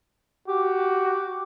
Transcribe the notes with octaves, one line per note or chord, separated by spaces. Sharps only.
F#4 G4